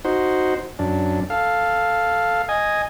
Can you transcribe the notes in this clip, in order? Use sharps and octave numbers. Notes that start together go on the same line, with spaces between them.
D#4 F#4 C5
F#2 D4
A4 F5
D#5 G#5